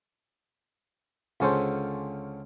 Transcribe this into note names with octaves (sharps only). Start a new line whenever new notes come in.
C#2 D3 C#4 A4 C5